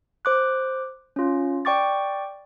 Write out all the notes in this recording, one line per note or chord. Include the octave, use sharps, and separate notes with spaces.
C5 D6 F#6
C#4 F4
D5 G5 C#6 D6 A6